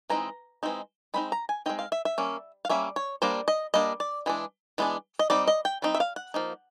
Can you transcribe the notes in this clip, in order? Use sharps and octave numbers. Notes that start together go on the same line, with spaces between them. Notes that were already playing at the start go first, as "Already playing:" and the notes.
E3 G#3 C4 D#4 A#5
E3 G#3 C4 D#4
G#3 C4 D#4 B5
A#5
G#5
G#3 C4 D#4 G5
F5
E5
E5
G3 A#3 C#4
F5
G3 A#3 C#4 E5
C#5
G3 A#3 D4 C5
D#5
G3 A#3 D4 D#5
D5
E3 G#3 D4
E3 G#3 B3 D4
D#5
G3 C4 D#4 D5
D#5
G5
G3 C4 D#4
E5
F5
F#5
F3 A#3 D#4